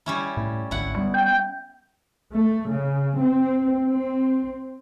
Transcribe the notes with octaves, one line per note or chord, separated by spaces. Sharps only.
G3 C#4 E4
A2
G#1 D2 E4 F#5
G3 A3 B3
G5
A3
C#3
C4
C4